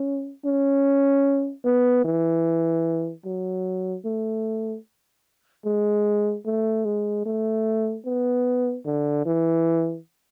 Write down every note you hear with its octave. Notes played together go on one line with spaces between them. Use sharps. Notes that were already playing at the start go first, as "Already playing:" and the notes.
Already playing: C#4
C#4
B3
E3
F#3
A3
G#3
A3
G#3
A3
B3
D3
E3